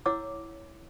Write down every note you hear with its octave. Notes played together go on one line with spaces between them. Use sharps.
E4 C#5 F#5 D6 E6